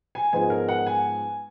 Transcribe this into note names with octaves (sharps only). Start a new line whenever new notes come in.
G#5
G#2 F3 G#3 B3 G#5
A#4
F#5
G#5